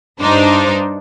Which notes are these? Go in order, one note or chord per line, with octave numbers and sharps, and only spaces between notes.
G2 D4 D#4 C5